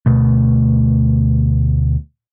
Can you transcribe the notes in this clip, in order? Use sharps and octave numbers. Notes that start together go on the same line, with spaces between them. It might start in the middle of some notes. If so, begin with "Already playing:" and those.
D2 B2 A3